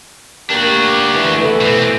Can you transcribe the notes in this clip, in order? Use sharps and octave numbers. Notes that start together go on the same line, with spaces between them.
A#3 D4 F#4 G4
E3
E3 A3 B3
B2 C4